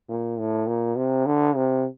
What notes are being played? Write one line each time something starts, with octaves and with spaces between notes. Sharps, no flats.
A#2
A2
A#2
C3
D3
C3